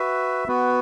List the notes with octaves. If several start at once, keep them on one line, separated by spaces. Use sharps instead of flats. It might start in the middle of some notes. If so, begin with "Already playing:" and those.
Already playing: F#4 B4 E5
B3 F#4 B4